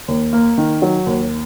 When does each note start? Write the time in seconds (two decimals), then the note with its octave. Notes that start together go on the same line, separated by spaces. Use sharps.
0.08 D#2
0.33 A#3
0.58 D#3
0.82 F#3
1.06 D#2